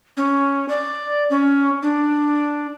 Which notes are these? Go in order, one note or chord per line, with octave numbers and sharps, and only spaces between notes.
C#4
D5
C#4
D4